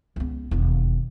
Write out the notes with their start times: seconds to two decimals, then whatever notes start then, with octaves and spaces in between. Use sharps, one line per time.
0.16 C#2 B3
0.51 E1 D#2